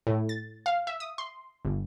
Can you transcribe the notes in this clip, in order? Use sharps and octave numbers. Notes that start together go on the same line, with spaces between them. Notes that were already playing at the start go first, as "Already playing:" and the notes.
A2
A6
F5
E5
D#6
C6
G1